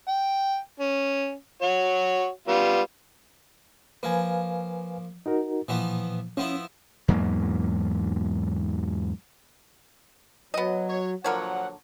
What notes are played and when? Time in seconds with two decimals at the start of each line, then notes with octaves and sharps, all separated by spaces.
0.08 G5
0.80 C#4
1.62 F#4 C#5
2.48 G3 B3 F4
4.03 F3 A#3 B4 F5 G#5
5.26 D#4 F#4 A#4
5.68 A#2 E3 F3 B3
6.37 F3 B3 C#4 E4
7.08 E2 G#2 F#3 A#3
10.54 F#3 B3 D#5
10.89 C#5
11.24 A#2 D3 F3 F#3 A#4 C#5 F#5